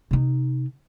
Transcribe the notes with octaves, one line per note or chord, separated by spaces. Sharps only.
C3 D#4